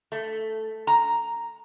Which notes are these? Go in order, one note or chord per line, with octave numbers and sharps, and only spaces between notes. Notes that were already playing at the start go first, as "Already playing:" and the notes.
A3
A#5